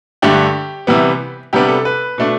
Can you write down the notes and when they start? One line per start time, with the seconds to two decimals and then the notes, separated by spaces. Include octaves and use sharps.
0.22 G2 D3 A3 D4 G4
0.87 C3 E3 G3 B3
1.53 C3 G3 B3 D4 G4
1.68 A4
1.85 B4
2.18 B2 A3 D4